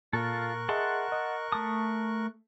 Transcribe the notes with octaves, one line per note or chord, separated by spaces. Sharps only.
A#2 F4 A4 A#4 C#6 F#6
G#4 D#5 E5 F#5 A5 C6
D#5
A3 A5 D#6